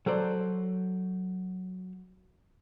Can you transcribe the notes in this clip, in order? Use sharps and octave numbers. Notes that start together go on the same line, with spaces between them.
F#3 A4 C5 D5